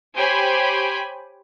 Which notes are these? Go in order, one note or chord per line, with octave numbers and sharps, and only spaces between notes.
G4 C5 C#5 G5 G#5 B5